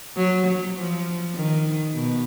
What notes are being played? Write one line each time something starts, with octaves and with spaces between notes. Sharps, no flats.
F#3
F#3
F3
D#3
B2